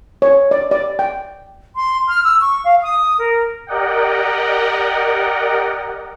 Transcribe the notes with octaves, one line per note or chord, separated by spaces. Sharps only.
C#5
D5
D5
G5
C6
F6
E6
C#6
F5
D#6
A#4
G4 A#4 D5 D#5 F#5 G5